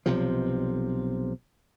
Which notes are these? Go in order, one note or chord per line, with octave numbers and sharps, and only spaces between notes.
B1 C3 F3